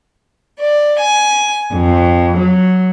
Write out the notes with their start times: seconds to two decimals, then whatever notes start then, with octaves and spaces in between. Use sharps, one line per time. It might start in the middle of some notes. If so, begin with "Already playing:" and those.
0.59 D5
0.99 G#5
1.73 F2
2.37 F#3